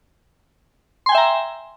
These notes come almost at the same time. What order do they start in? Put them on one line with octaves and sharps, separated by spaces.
C6 G#5 G5 E5 A#5